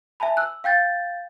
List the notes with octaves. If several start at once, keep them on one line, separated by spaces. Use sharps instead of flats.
E5 G#5 A5 B5
E6 F#6
F5 G5 G6 A6